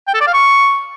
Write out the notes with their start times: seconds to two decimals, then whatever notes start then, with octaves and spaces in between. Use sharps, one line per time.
0.08 G5
0.14 A4
0.21 D5
0.27 F5
0.34 C#6